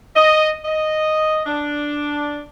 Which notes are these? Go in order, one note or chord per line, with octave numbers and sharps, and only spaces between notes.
D#5
D#5
D4